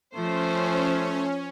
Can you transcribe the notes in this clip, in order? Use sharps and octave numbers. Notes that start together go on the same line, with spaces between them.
F3 A3 C#4 C5